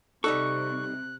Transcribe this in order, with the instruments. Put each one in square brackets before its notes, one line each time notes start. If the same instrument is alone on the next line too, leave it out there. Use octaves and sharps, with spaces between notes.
[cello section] C3 [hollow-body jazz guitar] G3 D#4 A4 [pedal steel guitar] C#6 [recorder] F#6